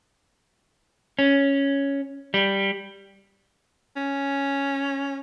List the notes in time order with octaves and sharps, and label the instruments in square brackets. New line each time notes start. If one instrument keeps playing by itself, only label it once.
[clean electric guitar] C#4
G3
[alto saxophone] C#4